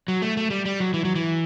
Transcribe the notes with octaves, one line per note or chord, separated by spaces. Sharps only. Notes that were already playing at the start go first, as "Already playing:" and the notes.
F#3
A3
A3
G3
G3
F#3
E3
F#3
E3